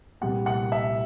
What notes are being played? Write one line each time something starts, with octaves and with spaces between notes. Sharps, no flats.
C2 A#2 G3 B3 F#5
F#5
E5